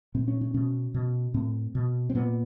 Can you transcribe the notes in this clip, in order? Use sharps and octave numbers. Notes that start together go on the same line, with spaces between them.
A#2 C4
C#4
C#4
B2 C#4
B2
A2 C4
B2
C4
A#2 B3